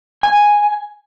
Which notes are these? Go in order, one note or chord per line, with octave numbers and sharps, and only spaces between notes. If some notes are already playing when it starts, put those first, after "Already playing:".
G#5